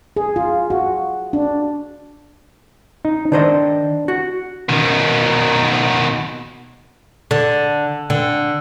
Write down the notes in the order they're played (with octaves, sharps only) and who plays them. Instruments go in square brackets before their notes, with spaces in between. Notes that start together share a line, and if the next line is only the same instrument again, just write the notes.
[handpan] G#4
F4
F#4
D4
[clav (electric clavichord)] D#4
[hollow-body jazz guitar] D#3 C5 D#5 [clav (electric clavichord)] D4
[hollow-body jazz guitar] F#4
[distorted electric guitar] B2 D#3
[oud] D3
D3